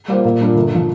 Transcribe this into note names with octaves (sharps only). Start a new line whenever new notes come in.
G3 A#3 F4 C5
A#2
G3 D4 F4 A#4
G1
F3